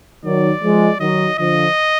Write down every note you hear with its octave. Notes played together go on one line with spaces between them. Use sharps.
D#3 F#3 D5
F3 G#3
D#3 F#3 D#5
D3 F3 D#5